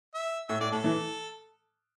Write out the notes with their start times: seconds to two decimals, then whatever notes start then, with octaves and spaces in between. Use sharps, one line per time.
0.14 E5
0.49 A2 E5
0.61 A2 D5
0.72 A2 A4
0.84 E3 A3